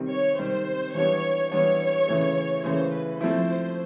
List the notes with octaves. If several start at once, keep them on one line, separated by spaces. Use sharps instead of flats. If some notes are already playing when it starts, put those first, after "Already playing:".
Already playing: C3 D#3 G3 C4
C#5
C3 D#3 G3 C4 C5
E3 G3 B3 D4 C#5
E3 G3 B3 D4 C#5
C#3 E3 A3
C#3 E3 A3 C5
B4
F3 A3 C4 E4 C5